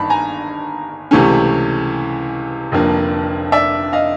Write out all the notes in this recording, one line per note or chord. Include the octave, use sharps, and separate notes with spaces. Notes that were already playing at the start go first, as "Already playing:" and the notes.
Already playing: G1 G2 D#3 A5 B5
G#5 A#5
C#2 C3 E3 A3 C#4
F1 F2 D3 F3 A#3
D5 E5
D#5 F5